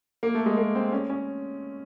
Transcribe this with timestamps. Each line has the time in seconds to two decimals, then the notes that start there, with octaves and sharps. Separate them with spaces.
0.23 A#3
0.35 A3
0.46 G#3
0.57 A#3
0.75 C4
0.92 C#4
1.10 C#4